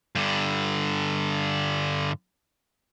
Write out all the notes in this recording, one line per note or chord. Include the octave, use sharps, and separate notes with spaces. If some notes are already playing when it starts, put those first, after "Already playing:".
G2 D3